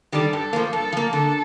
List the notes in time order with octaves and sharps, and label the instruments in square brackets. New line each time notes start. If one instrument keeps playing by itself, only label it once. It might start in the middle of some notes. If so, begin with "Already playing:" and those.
[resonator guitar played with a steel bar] D#3 G3 D4 A4
[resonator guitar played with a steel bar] G2 [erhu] A4
[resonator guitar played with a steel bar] F3 A#3
[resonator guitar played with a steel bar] G2 [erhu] A4
[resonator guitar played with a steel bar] F3 A#3
[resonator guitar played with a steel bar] D3 [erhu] A4